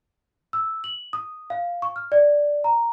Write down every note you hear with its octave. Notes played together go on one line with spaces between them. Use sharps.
E6
F#7
D#6
F5
C#6
F6
D5
A#5